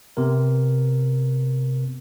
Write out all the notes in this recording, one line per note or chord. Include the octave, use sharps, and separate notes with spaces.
C3 B3 A#4